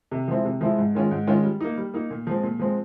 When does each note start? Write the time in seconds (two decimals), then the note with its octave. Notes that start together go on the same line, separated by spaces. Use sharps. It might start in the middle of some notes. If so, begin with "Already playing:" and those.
0.11 C3
0.28 F3 G#3 C4 E4
0.45 C3
0.61 F3 G#3 C4 E4
0.78 G#2
0.95 D#3 G#3 C#4 F4
1.11 G#2
1.27 D#3 G#3 C#4 F4
1.43 G3
1.61 A#3 D#4
1.77 G3
1.94 A#3 D#4
2.10 A#2
2.27 F3 G#3 C4
2.43 A#2
2.59 F3 G#3 C4